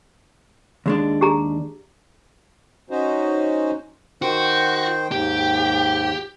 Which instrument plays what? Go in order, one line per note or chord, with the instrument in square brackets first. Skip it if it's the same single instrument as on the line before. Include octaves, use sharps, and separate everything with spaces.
[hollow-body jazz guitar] D#2 G#3 D4
[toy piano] G4 G#4 A#5
[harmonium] C#4 D#4 F#4 C5
[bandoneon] D#3 C5 G5 [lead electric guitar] F#4
[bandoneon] D#2 G#2 G5 [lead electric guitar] G4